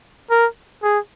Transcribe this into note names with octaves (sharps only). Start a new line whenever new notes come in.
A#4
G#4